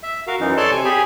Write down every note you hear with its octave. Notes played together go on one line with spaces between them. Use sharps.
E5
F#4 A#4 F5
F#2 E3 D#4
A4 C#5 D5 A5 C6 D6
C3 G#5
G4 G#4 G#5 B5